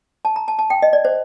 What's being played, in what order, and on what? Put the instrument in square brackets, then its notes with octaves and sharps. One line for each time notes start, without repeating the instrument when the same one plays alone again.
[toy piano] A5
A#5
A5
A5
G5
D#5
D5
C5